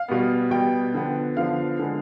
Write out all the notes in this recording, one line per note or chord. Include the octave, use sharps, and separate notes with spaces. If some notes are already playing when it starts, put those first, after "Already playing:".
Already playing: F5
B2 G3 B3
B2 G3 B3 G5
D3 F3 B3
D3 F3 B3 F5
D3 G#3 B3